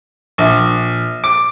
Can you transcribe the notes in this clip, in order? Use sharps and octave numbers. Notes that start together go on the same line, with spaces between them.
A#1
D6